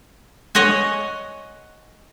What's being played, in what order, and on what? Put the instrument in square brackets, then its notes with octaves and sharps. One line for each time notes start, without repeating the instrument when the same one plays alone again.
[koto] C#5 D#5 F#5 G#5